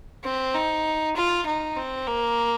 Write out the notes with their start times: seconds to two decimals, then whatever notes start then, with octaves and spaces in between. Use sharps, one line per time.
0.24 C4
0.54 D#4
1.16 F4
1.46 D#4
1.77 C4
2.08 A#3